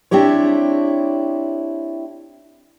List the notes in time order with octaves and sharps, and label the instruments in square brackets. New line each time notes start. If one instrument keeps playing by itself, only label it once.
[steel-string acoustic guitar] C4 D4 E4 G4 C#5